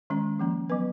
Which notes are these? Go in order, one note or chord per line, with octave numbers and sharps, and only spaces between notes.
D#3 G#3 C#4
F3 A#3 C#4
F#3 B3 B4